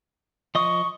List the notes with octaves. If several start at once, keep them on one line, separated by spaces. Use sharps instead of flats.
F3 D#5 C#6 D#6